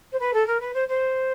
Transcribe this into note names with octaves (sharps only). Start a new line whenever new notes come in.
C5
B4
A4
A#4
B4
C5
C5